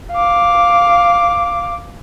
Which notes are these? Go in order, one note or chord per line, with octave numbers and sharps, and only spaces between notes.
F5 D6